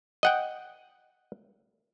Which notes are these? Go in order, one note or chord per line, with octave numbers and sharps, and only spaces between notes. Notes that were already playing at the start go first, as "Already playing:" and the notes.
D#5 F#5 G5